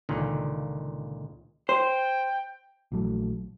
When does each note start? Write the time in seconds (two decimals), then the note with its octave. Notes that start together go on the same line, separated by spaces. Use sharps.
0.09 C#2 A#2 D3 D#3
1.69 C5 G5
2.92 A#1 E3 F#3 A3